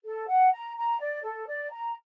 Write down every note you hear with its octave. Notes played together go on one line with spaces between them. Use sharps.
A4
F#5
A#5
A#5
D5
A4
D5
A#5